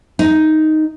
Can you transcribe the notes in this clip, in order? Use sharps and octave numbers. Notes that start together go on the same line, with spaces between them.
D#4